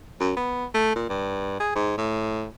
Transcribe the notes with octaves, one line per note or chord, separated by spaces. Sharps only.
F#2
B3
A3
A#2
G2
G#4
G#2
A2